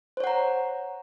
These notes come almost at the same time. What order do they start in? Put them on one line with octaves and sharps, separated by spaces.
C5 C#5 F#5 A#5